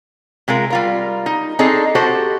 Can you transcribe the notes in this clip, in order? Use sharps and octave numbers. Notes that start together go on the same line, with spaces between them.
C3 G#3 F4 A#4
G3 F4 A#4
D#4
C4 D4 D#4 G#4 A4 D#5
F#4 G4 A4 C5